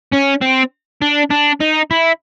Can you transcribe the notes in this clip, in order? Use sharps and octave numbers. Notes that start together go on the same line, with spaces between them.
C#4
C4
D4
D4
D#4
E4